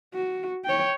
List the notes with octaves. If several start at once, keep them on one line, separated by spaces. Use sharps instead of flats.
F#4
C#5 G5